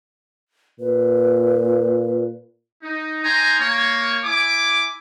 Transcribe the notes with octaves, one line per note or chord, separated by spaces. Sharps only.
A#2 B4
D#4
D#4 G5 G#5 A#5 C6
A#3 C#5
E4 G#5 D6